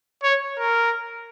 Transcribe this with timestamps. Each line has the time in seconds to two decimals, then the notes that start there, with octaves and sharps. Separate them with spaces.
0.23 C#5
0.59 A#4